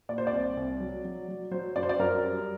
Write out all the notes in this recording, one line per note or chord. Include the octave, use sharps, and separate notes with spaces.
A#2 D5
C5
D5
C2
C2
F#3
F#3
F#3
F#3 C5
F#2 D5
C5
D5
F#2 A#4
G3